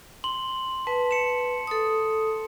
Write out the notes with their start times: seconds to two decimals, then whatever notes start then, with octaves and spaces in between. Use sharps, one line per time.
0.24 C6 F#7
0.87 B4 A5
1.11 C#7 E7
1.67 A4 D#6